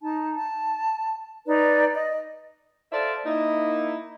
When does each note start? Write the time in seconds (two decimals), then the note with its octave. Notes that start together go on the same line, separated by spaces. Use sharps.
0.01 D#4 A5
0.34 A5
1.46 D#4 B4 D5
1.94 D#5
2.92 A4 C5 D5 E5 F5 A5
3.26 A#3 D#4 E4